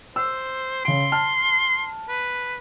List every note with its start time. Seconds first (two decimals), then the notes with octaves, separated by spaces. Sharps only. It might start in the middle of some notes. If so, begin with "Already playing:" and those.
0.16 C5 E6
0.85 C#3 C6 D7
1.12 A5 F6
2.09 B4